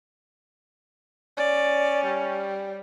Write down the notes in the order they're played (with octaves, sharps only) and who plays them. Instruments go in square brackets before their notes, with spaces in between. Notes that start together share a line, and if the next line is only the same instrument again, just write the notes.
[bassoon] C#4 [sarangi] D5
[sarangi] G3